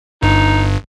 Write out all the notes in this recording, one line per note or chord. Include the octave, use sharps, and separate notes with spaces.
G1 G2 D#4